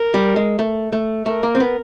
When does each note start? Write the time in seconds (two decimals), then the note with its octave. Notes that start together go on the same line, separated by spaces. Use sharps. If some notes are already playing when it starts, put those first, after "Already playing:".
Already playing: A#4
0.14 G3
0.36 G#3
0.59 A3
0.92 A3
1.26 A3 A#4
1.43 A#3
1.55 C4
1.60 B3